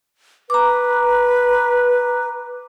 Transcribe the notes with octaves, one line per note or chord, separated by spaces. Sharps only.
B4 A#5 D6